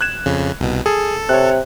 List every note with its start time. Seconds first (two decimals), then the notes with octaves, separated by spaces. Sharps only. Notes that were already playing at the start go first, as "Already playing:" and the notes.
0.01 F#6 G#6 E7
0.26 F2 C#3
0.60 C2 B2
0.86 G#4 A4
1.29 C3 C#5 F#6